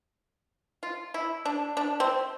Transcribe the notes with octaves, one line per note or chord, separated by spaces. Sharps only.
F4
E4
D4
D4
C4